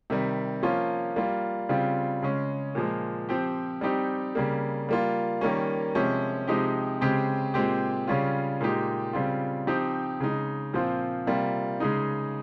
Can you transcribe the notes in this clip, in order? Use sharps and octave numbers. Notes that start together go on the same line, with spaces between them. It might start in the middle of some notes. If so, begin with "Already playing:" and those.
C3 D#3 G3
F3 A#3 C#4 F4
G3 A#3 F4
C#3 G3 C4 F4
C#3 G#3 C#4
A#2 F3 G#3
F3 C4 G4
G3 C4 D#4 G4
C#3 G3 A#3
G3 A#3 F4
D#3 G3 A#3 C#4
C3 F3 G#3 C#4
C3 F3 G#3 D#4 G4
C#3 G#3 C4 G4
A#2 G#3 C4 G4
C#3 G3 C#4 F4
A#2 G#3 D#4 G4
C#3 G3 C4 F4
F3 C4 D#4 G4
C#3 G#3 D#4
A#2 F3 C4 F4
C3 G3 A#3 F4
C#3 G#3 D#4